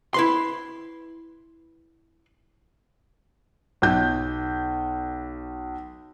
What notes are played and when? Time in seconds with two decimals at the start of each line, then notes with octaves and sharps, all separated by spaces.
0.14 E4 B4 C6
3.82 B1 G6